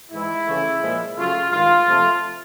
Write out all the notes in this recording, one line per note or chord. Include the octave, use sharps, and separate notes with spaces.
G#2 E3 G#3 E4
C#3 E3 A3
A#2 F3 G#3
C#3 F#3 A3 F4
G2 D#3 G#3 F4
C3 F3 A3